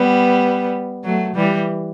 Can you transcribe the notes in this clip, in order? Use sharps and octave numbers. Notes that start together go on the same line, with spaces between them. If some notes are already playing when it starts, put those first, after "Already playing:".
Already playing: G3 B3
F#3 A3
E3 G3